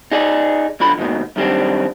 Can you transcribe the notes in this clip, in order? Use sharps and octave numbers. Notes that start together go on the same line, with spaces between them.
D#4 G#4 D5
B1 D3 F4 B5
D#2 G#2 B2 D#3
F#2 D#3 G3 C4 D4